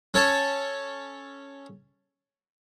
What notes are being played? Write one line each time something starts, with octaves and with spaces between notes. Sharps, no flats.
C#4 A4 C#5 A5